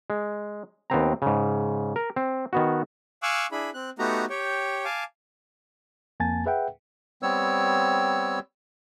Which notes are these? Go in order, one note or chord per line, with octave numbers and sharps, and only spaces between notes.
G#3
D#2 B3 C4 A#5
G#2 C#3
A#4
C4
D#3 B3 F#4
F5 G#5 C#6 D6 E6 F#6
D4 E4 G#4 B5
C4 F#6
A3 B3 D#4 F#4 G4 A#5
G4 C#5 G5
F5 G#5 A5 D6
F2 A#3 G#5 A5 A6
G#4 B4 E5 F#5 G5
G3 B3 C4 C#5 E6